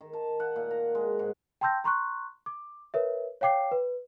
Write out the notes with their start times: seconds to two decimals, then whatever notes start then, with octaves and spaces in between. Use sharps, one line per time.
0.01 D#3
0.13 A5
0.40 F#5
0.56 A#2
0.71 A#5
0.95 G#3
1.19 G#2
1.61 G5 A5 C6 E6 G6 A#6
1.84 A#5 C6 C#6 F#6
2.46 D6
2.94 A#4 B4 C#5 E5
3.41 C#5 F5 G5 D6 C7
3.72 B4